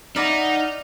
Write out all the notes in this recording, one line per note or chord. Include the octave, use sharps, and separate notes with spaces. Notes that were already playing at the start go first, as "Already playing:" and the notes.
D#4 D5 E5 F#5 A#5 B5 F6